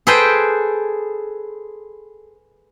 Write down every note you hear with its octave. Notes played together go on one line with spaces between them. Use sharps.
G#4 A4 B4 C5 G5